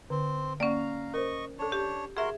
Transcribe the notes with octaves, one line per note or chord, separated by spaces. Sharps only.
D3 C4
A#3 C#4 D5 F5 F#5 A#5
A#4 C5 D#5 C#6
D4 A4 C#5 A5
G4
F#4 G#4 A#4 E5 C6